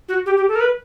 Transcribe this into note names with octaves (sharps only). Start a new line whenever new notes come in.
F#4
G4
G4
A4
A#4
B4